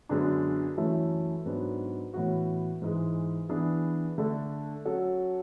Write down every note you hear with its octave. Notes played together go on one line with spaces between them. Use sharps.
F#2 D3 G#3 B3 D4
F#2 E3 A3 C#4 E4
G#2 F#3 B3 D4
A2 E3 B3 F#4
G#2 E3 G#3
E3 B3 D4 G#4
D3 A3 D4 A4
F#3 C#4 F#4 A4